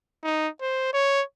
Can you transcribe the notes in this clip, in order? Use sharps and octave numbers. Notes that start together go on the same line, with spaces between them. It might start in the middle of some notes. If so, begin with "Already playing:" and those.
D#4
C5
C#5